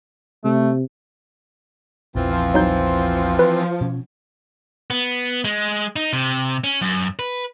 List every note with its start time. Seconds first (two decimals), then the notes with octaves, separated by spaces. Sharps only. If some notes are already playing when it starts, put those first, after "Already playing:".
0.44 C3 A3
2.15 A#1 E2 E3 C4 F4
2.31 F3
2.54 F#3 D#4 G6
3.39 B4
3.81 B2 C#4
4.90 B3
5.45 G#3
5.96 D#4
6.13 C3
6.64 C#4
6.82 F#2
7.19 B4